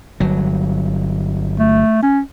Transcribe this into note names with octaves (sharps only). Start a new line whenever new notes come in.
G1 F#3
A3
C#4